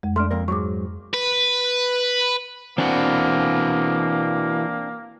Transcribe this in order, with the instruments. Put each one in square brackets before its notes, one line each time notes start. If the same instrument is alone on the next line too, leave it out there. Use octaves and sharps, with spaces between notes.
[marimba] F2 G#3
[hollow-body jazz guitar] A3 D4 [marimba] C6 F6
[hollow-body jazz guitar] F2 A#3 A#4
[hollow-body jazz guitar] G#2 F#3 [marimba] C#6 D6
[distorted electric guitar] B4
[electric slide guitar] E3 F#4 [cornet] A#3 [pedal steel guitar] C4 D4